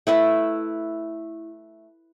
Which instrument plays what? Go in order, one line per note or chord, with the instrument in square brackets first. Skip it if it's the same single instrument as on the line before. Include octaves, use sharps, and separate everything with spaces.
[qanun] A3 E4 B4